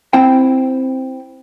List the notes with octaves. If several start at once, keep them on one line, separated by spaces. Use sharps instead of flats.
C4 E4 C5 G5